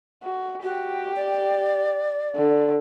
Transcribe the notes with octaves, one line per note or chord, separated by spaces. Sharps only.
F#4
F#4 G4
D5
D3